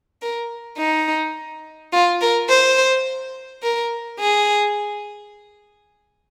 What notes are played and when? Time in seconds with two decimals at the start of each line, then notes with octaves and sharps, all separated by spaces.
0.22 A#4
0.79 D#4
1.93 F4
2.21 A#4
2.49 C5
3.63 A#4
4.20 G#4